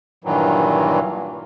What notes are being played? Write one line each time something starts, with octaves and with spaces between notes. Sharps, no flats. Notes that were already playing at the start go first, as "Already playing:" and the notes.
G2 A#2 D#3 E3 F#3